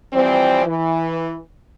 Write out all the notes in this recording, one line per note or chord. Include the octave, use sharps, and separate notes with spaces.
E3 F3 G3 C4
E3